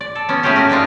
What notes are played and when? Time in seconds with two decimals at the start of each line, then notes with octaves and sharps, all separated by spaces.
0.01 D5
0.15 A4
0.29 B3 C#4
0.43 A3 A#3 C#4 F4 G4 G#4
0.56 F#4 A#4
0.70 A#3 D4 D#4 F4